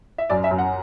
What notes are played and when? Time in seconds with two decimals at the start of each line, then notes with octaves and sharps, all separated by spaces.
0.18 E5
0.30 F#2 D5
0.44 E5
0.51 F#2
0.58 F#5